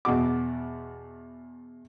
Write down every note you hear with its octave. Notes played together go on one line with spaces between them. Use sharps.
E2 B2 F#4 D6